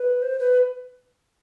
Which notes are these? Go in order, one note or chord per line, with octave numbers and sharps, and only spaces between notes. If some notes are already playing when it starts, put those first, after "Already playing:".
Already playing: B4
C5
B4